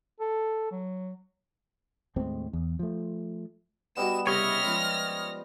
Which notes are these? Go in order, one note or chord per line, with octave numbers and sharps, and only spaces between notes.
A4
F#3
D#2 A2 G#3 C4
E2
F3 A3
G3 B3 D#4 E4 F#4 E7
C2 C#3 G4 C#5 D#5 E5 F6 A#6
F3 G#3 C#4